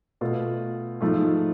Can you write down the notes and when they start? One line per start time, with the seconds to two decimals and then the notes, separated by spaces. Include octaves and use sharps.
0.21 B2 A3 F4
1.01 G#2 F3 A3 F4